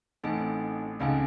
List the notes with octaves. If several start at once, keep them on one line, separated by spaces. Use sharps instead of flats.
A1 A2 C4 D#4 A4 D#5 G#5
C#2 C#3 C4 D#4 A4 D#5 G#5